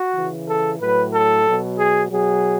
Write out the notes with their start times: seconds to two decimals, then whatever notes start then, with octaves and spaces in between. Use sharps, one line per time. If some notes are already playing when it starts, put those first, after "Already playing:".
Already playing: F#4
0.14 C#3 E3
0.47 A4
0.79 A2 F#3 B4
1.12 A4
1.46 B2 F#3
1.78 G#4
2.11 B2 F#3 G#4